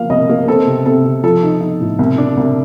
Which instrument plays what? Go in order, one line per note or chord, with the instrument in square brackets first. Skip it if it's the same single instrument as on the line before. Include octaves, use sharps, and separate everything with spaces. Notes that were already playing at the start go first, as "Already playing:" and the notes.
Already playing: [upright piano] F3 A#3 F5
C2 D#5
A#3
C4 A4
C3
C3 A4
C3
F3 A4
D#4
D#4
A2
C2
D4
C2